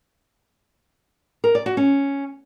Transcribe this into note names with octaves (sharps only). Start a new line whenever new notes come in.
A#4
D5
F#4
C#4